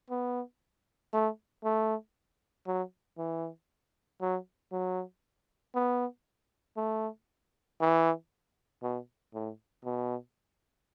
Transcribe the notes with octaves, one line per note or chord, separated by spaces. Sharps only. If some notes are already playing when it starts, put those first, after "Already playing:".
B3
A3
A3
F#3
E3
F#3
F#3
B3
A3
E3
B2
A2
B2